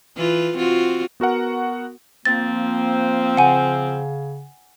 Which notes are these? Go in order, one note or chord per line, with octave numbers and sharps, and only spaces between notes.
E3 F4 B4
C4 F4 F#4
B3 F#4 A#4 F#5
F3 A#3 C4 A6
C#3 F#5 G#5